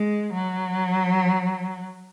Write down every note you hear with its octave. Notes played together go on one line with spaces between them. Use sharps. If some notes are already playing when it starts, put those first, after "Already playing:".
Already playing: G#3
F#3